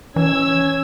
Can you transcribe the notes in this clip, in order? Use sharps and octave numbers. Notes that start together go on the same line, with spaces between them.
E3 C#4 E6 G#6